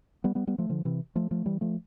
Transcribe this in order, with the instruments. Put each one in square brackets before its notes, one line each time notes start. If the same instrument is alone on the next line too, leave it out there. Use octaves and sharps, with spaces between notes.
[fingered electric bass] G3 B3
G3 B3
G3 B3
F3 A3
D3 F3
C3 E3
F3 A3
F3 A3
E3 G3
F3 A3